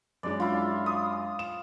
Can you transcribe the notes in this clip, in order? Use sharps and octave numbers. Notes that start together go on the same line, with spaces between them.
F#2 G#3 D4 D5
E4 F4
D#6
E7